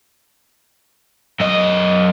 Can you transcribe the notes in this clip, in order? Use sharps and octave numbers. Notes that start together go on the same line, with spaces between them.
F#2 D#5